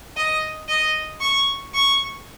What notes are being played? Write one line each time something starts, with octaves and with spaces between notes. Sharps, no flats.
D#5
D#5
C#6
C#6